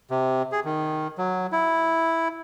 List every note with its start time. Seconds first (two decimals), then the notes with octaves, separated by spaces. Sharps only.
0.11 C3
0.52 G#4
0.65 D#3
1.18 F#3
1.52 E4